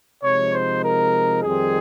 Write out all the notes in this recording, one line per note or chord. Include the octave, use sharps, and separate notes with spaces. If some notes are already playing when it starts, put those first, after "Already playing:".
C3 F3 G#3 D#4 C#5
C5
A#4
F2 D#3 G3 C4 D#4 G#4